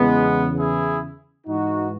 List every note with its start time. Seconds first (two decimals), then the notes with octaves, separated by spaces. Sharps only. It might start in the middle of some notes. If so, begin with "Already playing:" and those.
Already playing: E2 C#3 E3 G#3 B3
0.57 E4 G#4
1.46 G#2 E3 D#4 F#4